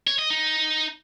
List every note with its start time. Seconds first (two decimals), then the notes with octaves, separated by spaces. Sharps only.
0.07 C#5
0.19 D#5
0.30 D#4